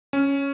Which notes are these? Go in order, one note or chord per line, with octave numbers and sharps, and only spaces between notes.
C#4